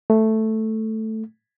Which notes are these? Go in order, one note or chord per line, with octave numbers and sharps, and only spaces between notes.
A3